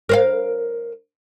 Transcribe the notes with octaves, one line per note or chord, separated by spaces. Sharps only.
A#4 C5 F5